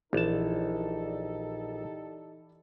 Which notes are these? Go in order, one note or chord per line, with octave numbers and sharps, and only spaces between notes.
A#1 E3 D#4 E4 G4 A4 D5 A5